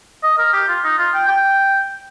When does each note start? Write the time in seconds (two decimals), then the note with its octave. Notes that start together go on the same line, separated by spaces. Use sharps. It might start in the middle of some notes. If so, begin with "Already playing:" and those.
0.23 D#5
0.38 A#4
0.53 G4
0.68 F4
0.84 D#4
0.98 F4
1.14 G5
1.28 G5